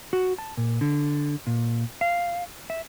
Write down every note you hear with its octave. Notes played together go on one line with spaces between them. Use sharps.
F#4
A5
A#2
D3
A#2
F5
E5